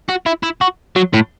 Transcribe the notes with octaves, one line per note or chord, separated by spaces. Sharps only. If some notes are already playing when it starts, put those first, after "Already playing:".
F#4
E4
E4
F#4
F#3
A2